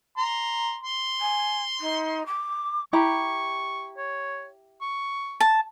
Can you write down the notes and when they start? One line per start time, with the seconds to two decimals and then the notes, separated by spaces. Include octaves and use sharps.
0.17 A#5 C6
0.84 C6
1.20 G#5
1.80 D#4
2.26 D6
2.93 E4 G4 A#5 C#6
3.97 C#5
4.81 C#6
5.40 A5